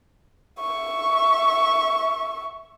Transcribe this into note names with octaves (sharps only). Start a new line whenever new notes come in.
E5 C#6